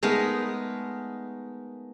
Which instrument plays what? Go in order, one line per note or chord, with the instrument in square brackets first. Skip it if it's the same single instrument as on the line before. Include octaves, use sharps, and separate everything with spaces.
[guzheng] G#3 A3 B3 D#4 A#4